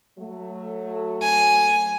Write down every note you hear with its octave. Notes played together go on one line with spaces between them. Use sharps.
F#3 A3
G#5